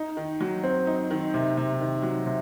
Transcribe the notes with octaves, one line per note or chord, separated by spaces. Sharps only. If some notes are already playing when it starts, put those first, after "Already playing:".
Already playing: D#4
D#3
F#3
C4
D#4
D#3
C3
C3
D#3
F#3
C3